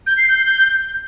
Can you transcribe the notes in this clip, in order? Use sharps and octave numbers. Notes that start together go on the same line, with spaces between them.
G6
C7
G6